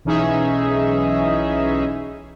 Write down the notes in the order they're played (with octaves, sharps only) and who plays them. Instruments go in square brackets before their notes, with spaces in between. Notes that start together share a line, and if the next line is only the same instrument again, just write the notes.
[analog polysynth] B1 E3 C#4 D#4 G#4 E5